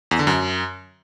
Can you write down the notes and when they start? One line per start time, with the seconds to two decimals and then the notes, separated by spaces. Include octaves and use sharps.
0.11 E2
0.19 D3
0.27 F#2